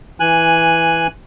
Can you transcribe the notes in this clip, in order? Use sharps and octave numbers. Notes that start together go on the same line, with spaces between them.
E3 G#5 F#6